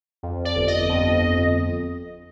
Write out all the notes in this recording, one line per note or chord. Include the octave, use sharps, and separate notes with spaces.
F2
D5
G1
D#5
F2